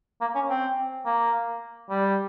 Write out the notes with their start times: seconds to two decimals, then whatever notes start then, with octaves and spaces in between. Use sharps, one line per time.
0.21 A#3
0.35 C#4
0.49 C4
1.06 A#3
1.90 G3